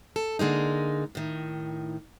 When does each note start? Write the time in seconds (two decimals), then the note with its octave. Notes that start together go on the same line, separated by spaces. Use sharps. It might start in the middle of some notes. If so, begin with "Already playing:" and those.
0.16 A4
0.39 D3 G#3 A#3 D#4
1.15 A2 D#3